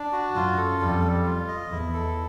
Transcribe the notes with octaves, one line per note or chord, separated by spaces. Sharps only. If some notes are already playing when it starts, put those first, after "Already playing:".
Already playing: D4
F#4
F#2 F4
A4
F2 G3
G3
F4
D#5
E2 E4
A4